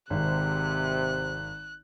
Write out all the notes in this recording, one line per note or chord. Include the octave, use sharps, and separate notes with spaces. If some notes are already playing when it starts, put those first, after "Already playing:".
G#1 C3 F#6